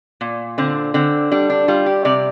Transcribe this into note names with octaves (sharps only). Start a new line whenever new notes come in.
A#2
D3 C4
D3 C4
G3 D4
D4
G3 F4
G4
C3 D5